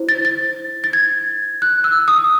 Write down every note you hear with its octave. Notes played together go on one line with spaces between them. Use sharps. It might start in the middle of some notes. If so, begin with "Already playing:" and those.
Already playing: E4 C5
A6
A6
A6
G#6
F#6
E6
D#6